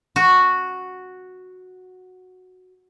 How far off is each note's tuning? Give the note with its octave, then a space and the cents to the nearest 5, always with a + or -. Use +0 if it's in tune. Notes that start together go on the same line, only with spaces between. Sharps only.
F#4 -5